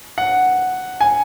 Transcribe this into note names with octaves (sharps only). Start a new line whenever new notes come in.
F#5
G#5